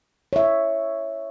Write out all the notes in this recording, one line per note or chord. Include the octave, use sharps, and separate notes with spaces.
C#5 E5